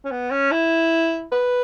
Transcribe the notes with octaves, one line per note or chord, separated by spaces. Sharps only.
C#4
B3
C#4
E4
B4